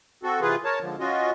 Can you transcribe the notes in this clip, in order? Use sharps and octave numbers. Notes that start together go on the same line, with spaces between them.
C4 F#4 A4
C3 E3 F4 G#4 B4
A#4 C#5 A5
G#2 D3 F3
C#4 F4 F#4 D#5